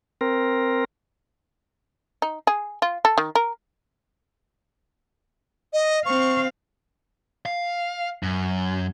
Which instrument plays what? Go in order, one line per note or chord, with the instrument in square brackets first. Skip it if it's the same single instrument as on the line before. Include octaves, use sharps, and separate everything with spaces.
[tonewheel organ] C4 A#4
[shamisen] D#4
G#4
F4
A4
D#3
A#4
[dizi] D#5
[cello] C4 F5 [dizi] C#6
[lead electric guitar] F5
F#2